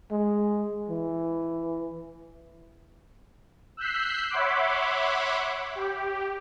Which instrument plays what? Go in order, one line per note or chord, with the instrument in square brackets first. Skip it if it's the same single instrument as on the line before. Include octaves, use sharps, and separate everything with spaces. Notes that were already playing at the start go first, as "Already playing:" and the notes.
[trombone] G#3
E3
[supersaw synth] E6 F#6 G6 B6 C7
C#5 E5 F#5 B5 C6 D6
G4